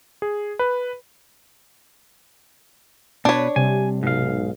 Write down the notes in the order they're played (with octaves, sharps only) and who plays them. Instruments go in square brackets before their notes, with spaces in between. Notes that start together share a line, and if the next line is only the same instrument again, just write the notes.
[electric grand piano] G#4
B4
[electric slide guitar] B2 B4 [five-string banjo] D4 C#5
[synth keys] C3 [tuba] G3 [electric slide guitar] G#5
[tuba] B1 [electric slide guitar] G#2 F5